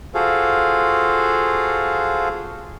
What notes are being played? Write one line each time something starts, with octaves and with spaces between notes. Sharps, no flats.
F4 F#4 G#4 A4 C5 F5